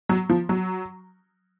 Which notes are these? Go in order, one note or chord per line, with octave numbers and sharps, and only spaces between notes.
F#3
F3
F#3